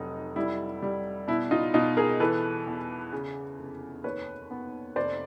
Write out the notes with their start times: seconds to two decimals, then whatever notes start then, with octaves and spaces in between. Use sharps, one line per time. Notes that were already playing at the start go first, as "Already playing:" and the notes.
Already playing: F1 F#3 D#4
0.36 G3 E4
0.82 G3
1.28 B2 E4
1.51 D#4 F4
1.74 B2 D#4 F4
1.97 G#4 A#4
2.20 E3 A4 B4
2.67 E2
3.13 C#3
3.58 F1
4.04 D#2 B4 C#5
4.51 B3
4.96 F1 C5 D5